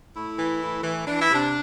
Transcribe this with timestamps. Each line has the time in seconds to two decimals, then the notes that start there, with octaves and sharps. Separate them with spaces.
0.15 A2 E4
0.37 E3
0.61 A2
0.83 E3
1.06 E3 D4
1.21 E4
1.30 C3 D4